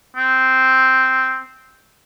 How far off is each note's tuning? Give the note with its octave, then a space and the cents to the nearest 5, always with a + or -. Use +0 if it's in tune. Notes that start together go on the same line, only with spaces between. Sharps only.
C4 -5